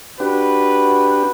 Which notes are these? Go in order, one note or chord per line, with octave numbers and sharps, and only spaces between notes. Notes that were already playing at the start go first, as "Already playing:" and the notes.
D4 F#4 G4 B4